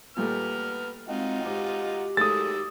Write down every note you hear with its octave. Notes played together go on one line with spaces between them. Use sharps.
A#2 G3 A3 B3 F6
G#3 C4 D#4 F4 F#4
G#2 G4
D#3 F#3 G#3 A3 D#6 E6 A6